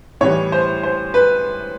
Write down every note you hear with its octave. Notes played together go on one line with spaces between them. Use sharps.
A2 E3 G3 C#5
C5
C5
B4